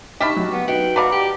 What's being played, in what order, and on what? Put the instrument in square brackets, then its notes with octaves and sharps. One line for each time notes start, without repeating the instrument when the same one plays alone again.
[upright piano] D#4 F6 [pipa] G4 A5 B5 [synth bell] E5 C#6
[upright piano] F#3
[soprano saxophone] B3
[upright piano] D#4 [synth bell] F#4 B4 [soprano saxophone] G5
[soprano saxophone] F#4 [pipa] B4 D5 F5 [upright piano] D#5 A5 A#5
[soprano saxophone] G4 [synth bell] F#5